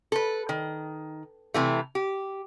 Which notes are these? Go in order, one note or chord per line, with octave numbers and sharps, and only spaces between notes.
A4 B4
D#3
C3 E3 A3
G4